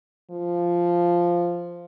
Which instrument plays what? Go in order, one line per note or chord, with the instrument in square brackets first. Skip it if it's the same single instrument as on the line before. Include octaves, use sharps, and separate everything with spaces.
[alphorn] F3